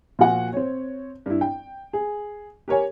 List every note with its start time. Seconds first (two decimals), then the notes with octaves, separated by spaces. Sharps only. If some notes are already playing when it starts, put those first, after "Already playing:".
0.19 A#2 F3 F#4 F#5 G#5
0.53 C4 C#5
1.26 G2 E4
1.41 G5
1.93 G#4
2.68 G4 A#4 C#5 G#5